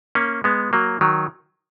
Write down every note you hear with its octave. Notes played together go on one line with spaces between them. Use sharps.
A#3 C#4
G#3 B3
F#3 A#3
D#3 F#3